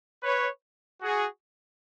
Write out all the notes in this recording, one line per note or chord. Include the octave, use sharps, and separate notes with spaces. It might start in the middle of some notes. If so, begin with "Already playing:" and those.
B4 C#5
F#4 G#4